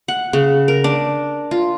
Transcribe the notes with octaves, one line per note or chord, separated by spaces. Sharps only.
F#5
C#3
A#4
D4
F4